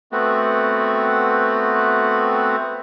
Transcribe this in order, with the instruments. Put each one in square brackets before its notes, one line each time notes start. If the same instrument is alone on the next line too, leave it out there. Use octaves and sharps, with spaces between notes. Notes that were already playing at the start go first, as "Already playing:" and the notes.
[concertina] A3 B3 C4 F#4